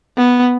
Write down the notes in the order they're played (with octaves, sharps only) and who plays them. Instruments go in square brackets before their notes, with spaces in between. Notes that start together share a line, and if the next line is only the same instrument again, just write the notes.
[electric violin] B3